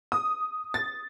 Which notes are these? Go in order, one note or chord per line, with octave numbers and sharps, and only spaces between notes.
D#6
A6